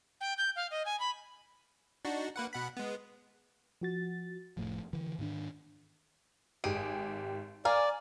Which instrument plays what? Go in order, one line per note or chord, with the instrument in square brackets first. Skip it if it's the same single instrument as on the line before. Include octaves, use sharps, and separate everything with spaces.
[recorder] G5
G6
F5
D#5
G#5
B5
[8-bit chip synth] D4 D#4 F#4
A#3 B4 F#5
B2 F#5 B5
G#3 B3
[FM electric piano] F3 F#4 A6
[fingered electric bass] F1 A2 F3
D3 E3
G#2 D#3 C#4 D4
[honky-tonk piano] G#1 G4 D7 [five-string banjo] G#4
[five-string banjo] A#4 F5 [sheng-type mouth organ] D5 [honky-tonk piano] G#5